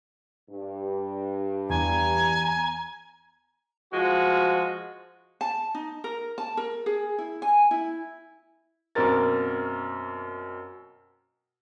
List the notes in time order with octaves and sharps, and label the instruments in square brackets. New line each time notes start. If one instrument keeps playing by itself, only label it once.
[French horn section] G2
[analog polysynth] E2 [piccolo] G#5 [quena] A#5
[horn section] F3 G#3 F#4
[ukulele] A5
D#4
A#4
A5
A#4
G#4
E4
G#5
E4
[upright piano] F#2 B2 A#3 C4 A#4 A6